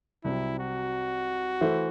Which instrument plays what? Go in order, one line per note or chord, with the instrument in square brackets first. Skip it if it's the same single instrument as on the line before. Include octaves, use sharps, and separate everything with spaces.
[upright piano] C2 C3 F#3 C4 [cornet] E4
[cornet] F#4
[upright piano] E3 A3 E4 A4 C5